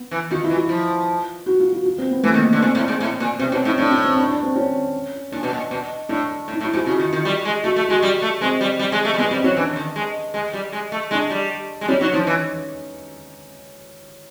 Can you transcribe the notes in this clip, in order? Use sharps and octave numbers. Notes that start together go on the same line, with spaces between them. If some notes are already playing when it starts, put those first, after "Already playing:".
Already playing: B3
E3
D#3 F4
E4
E3
F4
F3
F#4
F4
F#4
F4
C4
B3
E3 A3
D#3
A#3
D3 B3
A#2 C4
A2
G#2
A2
A#2
C3 C4
B2 C#4
A2 D#4
A2 D4
C#4
C4
D4
D4
C4
C#4
A#2 D4
B2
A#2
B2
A2 D4
A2
D#4
A2
E4
G#2
F4
C#3 F#4
D#3
D#3
G3
G#3
A3 F#4
A3
G#3 F#4
G3
A3
G#3 C4
G3
G3
G#3
A3
G3
G#3 B3
G3 C4
F#3 C#4
E3 D4
D#3
G#3
G#3
G3
G#3
A3
G#3 D4
G3
G#3
G3 C#4
F#3 D#4
F3 D#4
E3